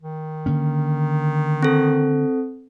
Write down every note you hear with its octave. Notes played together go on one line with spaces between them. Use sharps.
D#3
D3 A#3 C#4
C4 A4